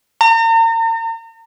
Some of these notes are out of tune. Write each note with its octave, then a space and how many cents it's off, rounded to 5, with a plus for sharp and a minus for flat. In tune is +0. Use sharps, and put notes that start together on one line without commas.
A#5 -40